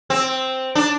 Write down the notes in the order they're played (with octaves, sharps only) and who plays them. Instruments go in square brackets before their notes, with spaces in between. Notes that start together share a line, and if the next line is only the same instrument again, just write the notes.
[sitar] C4
D4